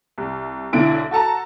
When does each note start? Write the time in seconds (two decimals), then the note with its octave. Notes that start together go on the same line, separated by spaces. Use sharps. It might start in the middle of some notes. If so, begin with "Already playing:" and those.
0.18 C2
0.73 B1 D3 E4 D7
1.11 F#4 A4 A5 A#5